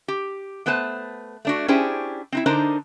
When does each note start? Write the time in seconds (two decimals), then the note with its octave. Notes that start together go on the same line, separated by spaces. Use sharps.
0.08 G4
0.66 A3 B3 B4 C5 A5
1.45 A3 D4 F#4
1.68 C#4 D4 E4 G4 G#4 C5
2.32 C4 D#4 E4
2.46 D3 D4 D#4 A#4 C5 A#5